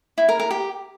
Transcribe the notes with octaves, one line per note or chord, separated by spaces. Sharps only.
E4
A#4
A#4
G4